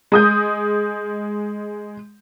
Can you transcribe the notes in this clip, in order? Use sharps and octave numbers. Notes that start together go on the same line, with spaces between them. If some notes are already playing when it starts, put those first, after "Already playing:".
G#3 D#6 G6